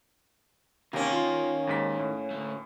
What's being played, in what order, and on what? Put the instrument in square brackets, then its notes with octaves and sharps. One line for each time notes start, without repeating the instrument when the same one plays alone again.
[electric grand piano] D#2 C3 [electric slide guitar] D#3 D#4 G5 [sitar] A#3 C#4
[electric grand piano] F4
D#2 G#2 B6
A2
[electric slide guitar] D3 A3